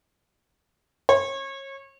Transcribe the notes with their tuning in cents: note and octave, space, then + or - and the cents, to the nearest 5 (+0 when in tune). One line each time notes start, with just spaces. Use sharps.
C#5 -30